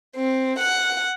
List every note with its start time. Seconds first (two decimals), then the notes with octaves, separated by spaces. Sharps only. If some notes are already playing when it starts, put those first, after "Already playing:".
0.16 C4
0.59 F#5